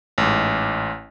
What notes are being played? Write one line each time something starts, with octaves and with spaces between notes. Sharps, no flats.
A1 G#2